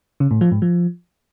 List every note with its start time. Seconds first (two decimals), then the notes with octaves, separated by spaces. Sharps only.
0.20 C#3
0.31 A2
0.41 F3
0.52 G#2
0.62 F3